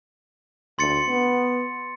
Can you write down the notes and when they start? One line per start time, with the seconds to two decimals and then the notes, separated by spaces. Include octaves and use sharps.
0.79 D2 C6 A6 C#7
1.08 B3